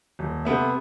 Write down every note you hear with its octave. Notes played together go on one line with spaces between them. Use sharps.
D#1
C3 A3 B3 E5